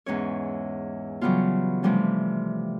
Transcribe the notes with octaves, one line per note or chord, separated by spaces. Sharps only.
E2 G#2 C#4 C#5
C#3 E3 F#3 G3 B3 F4
C3 E3 F3 G3 A3 C#4